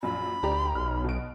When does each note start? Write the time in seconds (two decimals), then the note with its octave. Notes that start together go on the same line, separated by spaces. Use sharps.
0.03 A#1 F#2 B5
0.43 D2 G4 D5 A#5
0.75 B1 F6
1.04 B2 D7